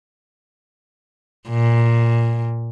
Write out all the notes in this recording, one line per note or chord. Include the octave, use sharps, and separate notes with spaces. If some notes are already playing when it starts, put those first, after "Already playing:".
A#2